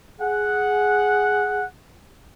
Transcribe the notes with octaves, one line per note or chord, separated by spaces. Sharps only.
G#4 F#5